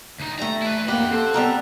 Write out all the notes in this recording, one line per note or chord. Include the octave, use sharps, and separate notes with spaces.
D2 D#4
G3 A3 A#5
E4 B4
F2 A#3 G4 F#5 B5
C4 A4
G3 B3 A#4